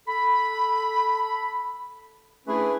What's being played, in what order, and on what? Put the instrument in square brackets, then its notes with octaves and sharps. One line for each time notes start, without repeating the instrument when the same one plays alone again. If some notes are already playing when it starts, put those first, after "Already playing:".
[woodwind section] A4 B5
A3 C#4 D4 E4 G#4 B4